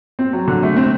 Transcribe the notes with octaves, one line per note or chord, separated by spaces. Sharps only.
C4
F#3
D3
A3
C4